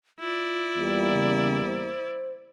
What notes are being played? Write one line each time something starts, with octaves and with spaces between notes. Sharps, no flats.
E4 F4 D5
E2 G3 A#3
C#3
C5